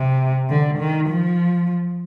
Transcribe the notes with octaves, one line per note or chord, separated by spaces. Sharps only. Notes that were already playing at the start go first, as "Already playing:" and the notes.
Already playing: C3
D3
D#3
F3